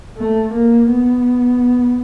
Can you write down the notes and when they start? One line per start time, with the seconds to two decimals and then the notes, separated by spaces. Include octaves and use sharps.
0.18 A3
0.54 A#3
0.90 B3